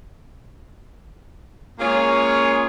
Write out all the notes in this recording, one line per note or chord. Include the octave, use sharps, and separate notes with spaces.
G#3 A#3 C#4 F4 G#4 C#5